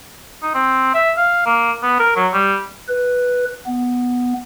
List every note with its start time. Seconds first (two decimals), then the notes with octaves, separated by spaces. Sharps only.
0.42 D#4
0.54 C4
0.94 E5
1.17 F5
1.46 A#3
1.83 B3
1.99 A#4
2.16 F#3
2.34 G3
2.88 B4
3.67 B3